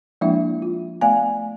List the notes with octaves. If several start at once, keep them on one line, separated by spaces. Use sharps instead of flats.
F3 G#3 A#3 D4 E4 E5
F4
A3 B3 D5 F5 G#5